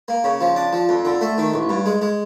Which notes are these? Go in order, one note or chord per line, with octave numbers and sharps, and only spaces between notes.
A#3
C#3
F3
D4
F3
F2
D3
A3
D#3
A1
G2
G#3
G#3